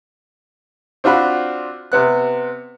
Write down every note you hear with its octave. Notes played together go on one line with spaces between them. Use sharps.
C4 D4 F4 F#4 B5
C3 B3 F#6